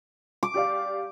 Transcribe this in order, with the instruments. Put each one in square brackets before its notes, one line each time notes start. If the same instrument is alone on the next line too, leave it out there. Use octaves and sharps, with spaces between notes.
[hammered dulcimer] D6
[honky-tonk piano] G4 D5 F5